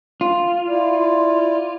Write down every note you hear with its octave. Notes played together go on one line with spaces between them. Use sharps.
F4
E4 D5